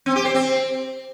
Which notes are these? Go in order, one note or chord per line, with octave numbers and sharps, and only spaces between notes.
C4
G4
C5
C4